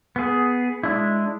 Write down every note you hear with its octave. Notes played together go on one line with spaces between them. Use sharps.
B3 G#4
G#3 D4 E4